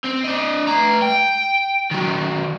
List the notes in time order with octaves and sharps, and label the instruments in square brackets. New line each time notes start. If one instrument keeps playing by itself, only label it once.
[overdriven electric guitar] C4
D4 D#5
A3 A#5
G5
D#3 F#3